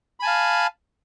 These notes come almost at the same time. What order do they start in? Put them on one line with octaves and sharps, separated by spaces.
B5 G#5 A5 F5